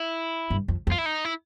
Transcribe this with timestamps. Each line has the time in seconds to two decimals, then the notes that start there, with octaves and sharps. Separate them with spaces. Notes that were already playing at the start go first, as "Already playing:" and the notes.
Already playing: E4
0.51 G2
0.68 F2
0.87 F2
0.92 F4
0.98 E4
1.06 D#4
1.25 E4